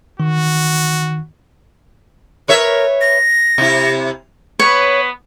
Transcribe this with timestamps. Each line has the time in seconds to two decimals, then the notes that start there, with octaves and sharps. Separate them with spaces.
0.20 D#3 F#4
2.48 A#4 B4 C#5 E5
3.01 A#6
3.58 C3 E4
4.59 B3 B4 C#5